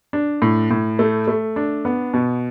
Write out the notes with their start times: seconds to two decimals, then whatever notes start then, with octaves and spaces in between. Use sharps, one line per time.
0.13 D4
0.42 A2
0.71 A2
0.99 A3
1.28 A3
1.56 D4
1.85 B3
2.14 B2